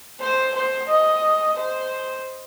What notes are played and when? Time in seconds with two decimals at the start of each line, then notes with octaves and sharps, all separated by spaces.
0.20 C5
0.54 C5
0.88 D#5
1.57 C5